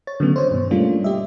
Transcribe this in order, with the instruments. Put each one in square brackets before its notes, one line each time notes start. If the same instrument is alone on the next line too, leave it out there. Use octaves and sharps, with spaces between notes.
[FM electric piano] C#5 A6
D3 D#3 F#3 A3 B3 C#4
C5 C#5
G2 B2
G3 A3 A#3 C#4 D4 F4
G4 D#5 E5